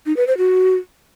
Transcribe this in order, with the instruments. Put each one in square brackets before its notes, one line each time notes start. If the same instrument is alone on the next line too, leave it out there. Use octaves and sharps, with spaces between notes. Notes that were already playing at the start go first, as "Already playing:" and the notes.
[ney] D#4
B4
C5
F#4